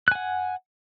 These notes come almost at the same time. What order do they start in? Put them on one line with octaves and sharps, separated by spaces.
F#6 G#5 F#5